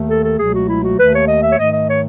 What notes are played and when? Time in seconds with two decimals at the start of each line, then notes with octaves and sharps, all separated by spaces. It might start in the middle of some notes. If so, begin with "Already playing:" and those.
Already playing: D#2 D#3 A3
0.09 A4
0.24 A4
0.38 C#2 B2 F#3 A3 G#4
0.53 F#4
0.68 E4
0.84 F#4
0.97 D#2 D#3 A3 B4
1.14 C#5
1.28 D#5
1.43 E5
1.51 C#5
1.58 G#2 D#3 A3 D#5
1.73 D#5
1.88 C#5